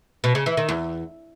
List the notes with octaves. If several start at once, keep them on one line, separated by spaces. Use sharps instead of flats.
B2
C#3
E3
D#3
E2